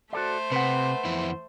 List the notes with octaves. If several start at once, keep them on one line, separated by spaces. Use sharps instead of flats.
A3 F#4 A4 C5 D5
C3 B4 F#5
F2 E3 E4